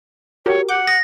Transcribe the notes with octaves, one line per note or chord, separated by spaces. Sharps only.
F#4 G4 A#4 C#5
F#5 D6 G6
D#6 A#6